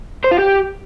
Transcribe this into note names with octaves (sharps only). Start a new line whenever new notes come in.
C5
F4
G4